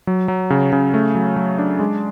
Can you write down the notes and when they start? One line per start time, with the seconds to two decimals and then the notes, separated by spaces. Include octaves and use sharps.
0.07 F#3
0.28 F#3
0.50 C#3
0.72 C#3
0.94 A3
1.15 F#3
1.36 F#3
1.58 D4
1.80 G#3